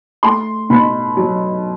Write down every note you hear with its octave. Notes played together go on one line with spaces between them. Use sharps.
A3 C6
B2 B5
F#3